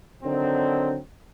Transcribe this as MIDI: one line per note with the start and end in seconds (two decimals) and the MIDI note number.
0.23 0.96 50
0.23 0.96 51
0.23 0.96 54
0.23 0.96 60